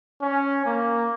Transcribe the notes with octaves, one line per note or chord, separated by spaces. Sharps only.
C#4
A#3